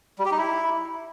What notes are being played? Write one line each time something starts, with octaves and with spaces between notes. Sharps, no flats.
G3
G4
D#4
E4